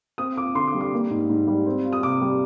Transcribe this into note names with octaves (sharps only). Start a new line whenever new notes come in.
C4 D#6
F4 D6
D3 C6
D6
G3
D6
A#3
G#2
G#2
G3
C4
F4
D#6
C3 D6
G3